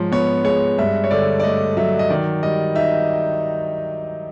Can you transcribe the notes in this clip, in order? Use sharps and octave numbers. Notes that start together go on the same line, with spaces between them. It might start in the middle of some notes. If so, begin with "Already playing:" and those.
Already playing: G#2 F3 C#5
B3 C#5
G#3 C#5
G2 E5
C#5
D3 D5
D5
A3 D#5
F#3 E5
D#5
D#3 D5
G3 D#5
D#4 E5